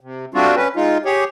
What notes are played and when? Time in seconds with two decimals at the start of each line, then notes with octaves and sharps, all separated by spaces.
0.01 C3
0.34 G3 A3 C4 D4 F4 F#4
0.56 C#4 B4
0.76 G#3 D#4 F4
1.05 G4 G#4 C#5